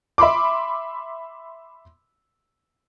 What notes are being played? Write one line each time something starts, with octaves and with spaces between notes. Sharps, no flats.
E5 B5 C6 D6